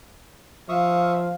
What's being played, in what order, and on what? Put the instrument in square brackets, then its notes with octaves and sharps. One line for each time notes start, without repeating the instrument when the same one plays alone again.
[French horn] F3 [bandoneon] E5 C#6 D#6 [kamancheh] F5